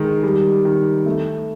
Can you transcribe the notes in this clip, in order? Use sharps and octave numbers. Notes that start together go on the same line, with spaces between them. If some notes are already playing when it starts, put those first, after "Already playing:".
Already playing: D#3 G#3
G3
D#3
A3